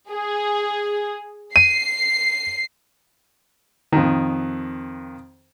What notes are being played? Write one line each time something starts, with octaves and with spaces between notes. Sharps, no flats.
G#4
C7 D#7
F2 D#3